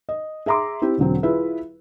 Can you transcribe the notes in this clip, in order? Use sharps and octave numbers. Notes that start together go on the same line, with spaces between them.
D#5
G#4 E5 A#5 C6 D6
C4 E4 G4
E1 D3 F#3 C4
E4 F4 G#4 B4 E5